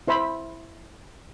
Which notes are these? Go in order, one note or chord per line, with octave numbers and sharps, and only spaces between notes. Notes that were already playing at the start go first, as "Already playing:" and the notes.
E4 C5 E5 B5